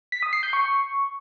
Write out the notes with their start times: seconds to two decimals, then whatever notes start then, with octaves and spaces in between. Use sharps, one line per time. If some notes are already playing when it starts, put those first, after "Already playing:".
0.12 B6
0.22 D#6
0.33 C7
0.43 G6
0.53 C#6